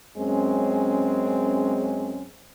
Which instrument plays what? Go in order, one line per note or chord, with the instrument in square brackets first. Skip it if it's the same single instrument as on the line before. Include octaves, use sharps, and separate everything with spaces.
[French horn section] F#2 G#3 C4 C#4